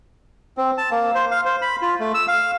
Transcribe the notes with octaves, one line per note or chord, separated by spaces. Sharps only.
C4
A5
A#3
C5
F5
C5
B5
F4
A3
E6
F5